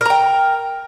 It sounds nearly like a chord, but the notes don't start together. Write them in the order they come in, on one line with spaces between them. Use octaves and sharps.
A#4 A#5 G5